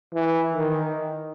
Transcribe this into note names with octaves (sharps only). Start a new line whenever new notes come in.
E3
D#3